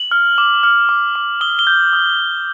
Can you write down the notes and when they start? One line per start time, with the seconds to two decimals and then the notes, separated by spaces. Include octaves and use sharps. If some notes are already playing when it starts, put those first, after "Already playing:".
Already playing: F#7
0.11 F6
0.38 D6
0.63 F6
0.89 D6
1.15 D6
1.41 D#6 G7
1.59 G7
1.67 G6
1.93 D#6
2.19 D#6